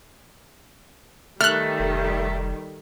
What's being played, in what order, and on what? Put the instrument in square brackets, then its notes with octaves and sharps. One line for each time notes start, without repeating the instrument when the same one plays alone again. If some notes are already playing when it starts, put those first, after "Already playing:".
[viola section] D#3 G3 [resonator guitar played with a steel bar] A3 [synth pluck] F6 F#6
[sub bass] F1